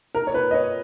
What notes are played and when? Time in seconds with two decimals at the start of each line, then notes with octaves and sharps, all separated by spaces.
0.14 A#4
0.27 C#5
0.34 B4
0.51 D#5
0.54 C#5